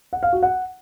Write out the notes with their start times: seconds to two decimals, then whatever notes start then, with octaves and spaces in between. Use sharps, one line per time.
0.13 F#5
0.23 F5
0.33 F#4
0.43 F#5